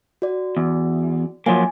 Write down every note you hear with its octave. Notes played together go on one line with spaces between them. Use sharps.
F#4 D5
E2
F3 F#3 A#3 G#5